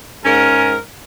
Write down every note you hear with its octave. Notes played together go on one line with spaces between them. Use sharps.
G#2 C#4 A#4